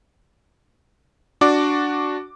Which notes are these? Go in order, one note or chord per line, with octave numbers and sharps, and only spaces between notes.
D4 F#4 D5 D6